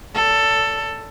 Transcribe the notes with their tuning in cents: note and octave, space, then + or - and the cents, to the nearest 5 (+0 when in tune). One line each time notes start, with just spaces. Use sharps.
A4 +10 D5 -40